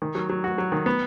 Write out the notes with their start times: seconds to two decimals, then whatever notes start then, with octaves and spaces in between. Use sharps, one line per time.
0.02 D#3
0.15 F#3
0.30 F#3
0.44 F#4
0.58 F#3
0.72 D#3
0.86 B3